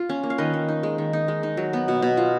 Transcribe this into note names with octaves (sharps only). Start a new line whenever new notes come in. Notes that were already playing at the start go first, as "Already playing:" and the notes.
Already playing: F4
C#4
A#3
F5
D#3 B4 D#5
D#3
D#4
G#3
D#3
D#4
G#3
D#4
F#3
B3
B2
B2
F4